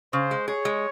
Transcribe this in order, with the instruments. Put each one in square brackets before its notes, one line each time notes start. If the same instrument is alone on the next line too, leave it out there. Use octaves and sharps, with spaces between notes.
[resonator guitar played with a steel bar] C#3 [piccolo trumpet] C5
[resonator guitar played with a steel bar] G#3
[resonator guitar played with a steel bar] G#4 [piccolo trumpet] C#5
[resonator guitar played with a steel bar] G#3